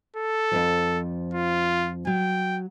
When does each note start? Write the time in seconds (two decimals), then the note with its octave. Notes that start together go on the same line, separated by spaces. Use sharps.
0.16 A4
0.51 F2 G#2 F3
1.34 F4
2.07 F#3 G5